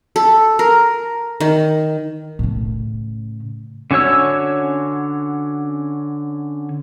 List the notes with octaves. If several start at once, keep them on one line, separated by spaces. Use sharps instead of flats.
A4
A#4
D#3
A2 C#3
D3 C#4 F#4 C#5 E6